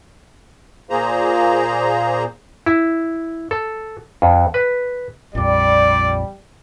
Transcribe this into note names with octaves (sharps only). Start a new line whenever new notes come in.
A#2 A#3 G#4 C5 A#5
E4
A4
F2
B4
A#1 F2 G3 D5